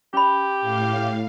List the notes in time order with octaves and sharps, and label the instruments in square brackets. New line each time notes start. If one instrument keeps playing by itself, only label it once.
[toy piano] C#4 B5 [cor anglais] G4
[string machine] A2 F5